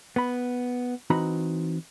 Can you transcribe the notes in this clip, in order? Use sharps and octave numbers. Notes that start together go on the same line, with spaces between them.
B3 B5
E3 C4 D#4 F#4 A#5 B5